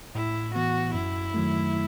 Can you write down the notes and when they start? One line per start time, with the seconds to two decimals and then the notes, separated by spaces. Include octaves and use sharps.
0.15 A2 E4
0.55 E3 B3 F#4
0.94 F#2 E4
1.34 D#3 F#3 A3